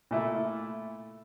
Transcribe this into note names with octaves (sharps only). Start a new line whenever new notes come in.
A#2 A3 E4